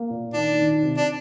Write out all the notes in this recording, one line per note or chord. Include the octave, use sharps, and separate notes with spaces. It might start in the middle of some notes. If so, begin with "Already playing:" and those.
Already playing: A#3
A#2
D#3 D4
D#3
C3
D4